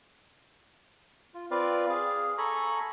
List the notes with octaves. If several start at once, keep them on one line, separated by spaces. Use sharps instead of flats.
F4
C4 F4 B4 D5 F5
G#4 F5
A4 G#5 A#5 B5 C#6